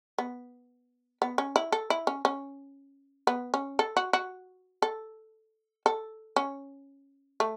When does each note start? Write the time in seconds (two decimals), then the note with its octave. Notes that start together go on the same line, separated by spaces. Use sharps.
0.18 B3
1.22 B3
1.38 C#4
1.56 E4
1.72 A4
1.90 E4
2.07 C#4
2.25 C#4
3.27 B3
3.54 C#4
3.79 A4
3.97 F#4
4.13 F#4
4.82 A4
5.86 A4
6.36 C#4
7.40 A3